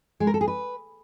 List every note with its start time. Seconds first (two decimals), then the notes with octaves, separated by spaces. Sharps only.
0.20 G#3
0.27 A#4
0.34 A4
0.41 G#4
0.48 B4